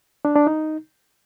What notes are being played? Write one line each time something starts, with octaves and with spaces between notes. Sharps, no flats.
D4
D4
D#4